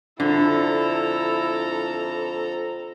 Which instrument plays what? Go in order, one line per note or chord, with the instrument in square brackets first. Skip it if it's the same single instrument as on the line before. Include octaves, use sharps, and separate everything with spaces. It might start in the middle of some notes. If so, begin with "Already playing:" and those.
[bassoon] F2 [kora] D3 [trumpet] E4 [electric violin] A4 A#5